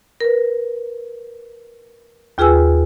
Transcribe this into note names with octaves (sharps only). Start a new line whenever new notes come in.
A#4 B4
D#2 F4 G#4 B4 G#5 E6